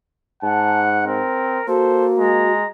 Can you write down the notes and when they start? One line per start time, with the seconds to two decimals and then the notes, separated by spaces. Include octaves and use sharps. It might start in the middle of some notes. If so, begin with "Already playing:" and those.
0.43 G#2 F#5 A5
1.06 C4 A#4
1.68 A#3 F#4 A4 C5
2.18 G#3 A#5